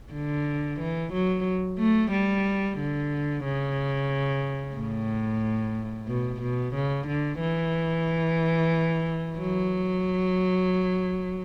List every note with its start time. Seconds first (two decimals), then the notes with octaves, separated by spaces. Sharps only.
0.13 D3
0.80 E3
1.13 F#3
1.78 A3
2.12 G3
2.78 D3
3.44 C#3
4.76 A2
6.08 B2
6.41 B2
6.75 C#3
7.07 D3
7.40 E3
9.38 F#3